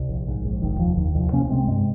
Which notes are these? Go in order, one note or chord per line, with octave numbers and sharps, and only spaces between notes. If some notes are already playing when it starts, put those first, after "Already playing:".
Already playing: C2
A#1
G#2
A#1
F1 D#3
D#2 F3
D#2 D#3
C2 F3
C3 A#3 C#4
C#4
C3 G#3 C4
G2 G#3 C4